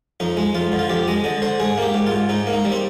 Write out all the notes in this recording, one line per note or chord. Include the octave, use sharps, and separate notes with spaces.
F2 D#4
G#3
F2 F4
D3
F4
F2 G4
G#3 D#5
D3 D#5
D3 C5
G#2 G#4
A#3 G4
G#2
F4
G#2
G#2 D#4
A#3
D#4
G3
C4